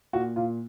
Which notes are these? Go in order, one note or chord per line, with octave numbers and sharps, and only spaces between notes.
A#2 F#4
A#2 F4